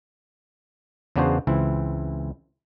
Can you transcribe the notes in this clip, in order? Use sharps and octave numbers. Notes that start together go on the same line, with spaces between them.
E2 C#3 B3 D4 F#4 C5
C#2 E3 C4 E4